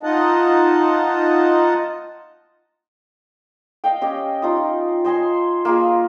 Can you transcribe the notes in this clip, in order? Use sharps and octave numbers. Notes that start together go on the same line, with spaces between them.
D#4 F4 D#5 F#5 A5
D#5 F5 G5
C#4 G4 D#5
D#4 F4 D#6
C5 D#5 G#5 C6
A#3 F4 G#4